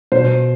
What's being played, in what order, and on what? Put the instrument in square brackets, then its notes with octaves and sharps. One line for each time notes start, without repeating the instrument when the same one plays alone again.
[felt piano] B2 C5